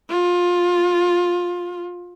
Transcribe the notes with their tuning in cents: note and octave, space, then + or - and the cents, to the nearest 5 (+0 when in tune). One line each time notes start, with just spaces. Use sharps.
F4 +15